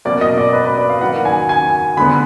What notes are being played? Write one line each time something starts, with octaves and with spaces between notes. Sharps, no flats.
B2 F#3 A#3 D5
D#5
D5
B4
B4
D5
F5
D#3 F#3 A#3 F#5
G#5
G#5
D3 G#3 B3 B5